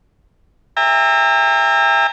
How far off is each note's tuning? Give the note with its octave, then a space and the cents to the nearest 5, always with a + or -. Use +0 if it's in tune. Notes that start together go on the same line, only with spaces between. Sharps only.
E5 +0 G5 +45 A#5 -30